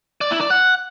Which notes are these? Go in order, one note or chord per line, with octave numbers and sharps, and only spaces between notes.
D5
E4
D5
F#5